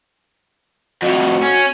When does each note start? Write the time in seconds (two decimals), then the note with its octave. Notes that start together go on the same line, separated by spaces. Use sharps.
1.02 F2 A2 F#4
1.42 C#4